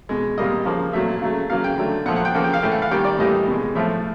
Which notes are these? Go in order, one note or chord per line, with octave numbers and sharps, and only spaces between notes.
B2 G#3
A#2 G3 A#3 D#5
C#3 F3 A#3
A#2 F#3 A3 E5
C#3 F#3 A3
C#3 F#3 A#3 F5
G5
D3 F#3 A3
A#2 F3 A3 F#5
F#5
G5
C#3 F3 A#3
G5
F5
A2 E3 A3 G5
F#5
F5
D#3 G3 A#3 G5
D5
A2 E3 G3 A#3 D#5
B2 G#3
A2 F3 A3 E5